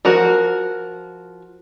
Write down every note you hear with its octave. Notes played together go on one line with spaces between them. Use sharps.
F3 F#4 A#4